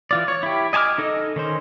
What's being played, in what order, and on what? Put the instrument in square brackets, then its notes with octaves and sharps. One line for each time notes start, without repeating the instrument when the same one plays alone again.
[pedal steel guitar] E3 F4 D5
C#5
E4 G4
D#5 G#5 A5 D6 F6
D#4 A4 D#5
D#3 C#4 C5